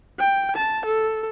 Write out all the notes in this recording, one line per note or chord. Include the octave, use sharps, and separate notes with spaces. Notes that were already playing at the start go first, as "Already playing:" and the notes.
G5
A5
A4